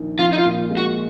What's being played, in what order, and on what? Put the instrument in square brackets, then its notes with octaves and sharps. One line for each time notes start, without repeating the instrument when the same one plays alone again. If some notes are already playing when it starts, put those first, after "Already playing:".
Already playing: [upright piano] A#1 D#3
[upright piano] F3 [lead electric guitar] F4
[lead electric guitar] D#4
F4
[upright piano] A#2
G#3
[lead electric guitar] F#4